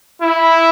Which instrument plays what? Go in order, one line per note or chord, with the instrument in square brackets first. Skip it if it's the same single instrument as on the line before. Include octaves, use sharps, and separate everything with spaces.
[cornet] E4